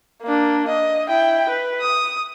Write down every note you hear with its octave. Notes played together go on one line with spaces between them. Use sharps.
A#3 D4
D#5
E4 G5
B4
D#6